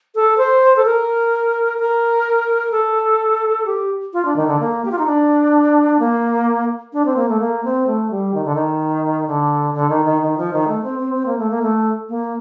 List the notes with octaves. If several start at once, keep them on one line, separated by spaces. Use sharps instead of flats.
A4
C5
A4
A#4
A#4
A4
G4
F4
D4
D#3
D3
A#3
G4
F4
D#4
D4
A#3
D4
C4
A#3
A3
A#3
C4
A3
G3
D#3
D3
D#3
D3
D3
D#3
D#3
D#3
F3
D#3
A3
C4
C4
C4
A#3
A3
A#3
A3
A#3